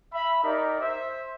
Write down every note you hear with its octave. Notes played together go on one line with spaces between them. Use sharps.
E5 B5
D#4 G4 A#4 D5
C5 E5